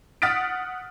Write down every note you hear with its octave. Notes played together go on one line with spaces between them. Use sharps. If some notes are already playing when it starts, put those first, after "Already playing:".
F#5 D#6 F6 A6 B6 D7